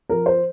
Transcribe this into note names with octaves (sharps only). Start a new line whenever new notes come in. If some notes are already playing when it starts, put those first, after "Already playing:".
F3 A#4
C5